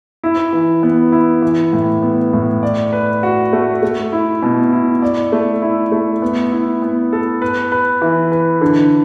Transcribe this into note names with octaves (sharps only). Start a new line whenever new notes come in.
E4
E3
B3
E4
E3
A2
B3
A2
D5
B4
F#4
A3
A3
E4
B2
E4
D5
A3
E4
A3
B3
E4
B3
A4
B4
B4
E3
B4
D3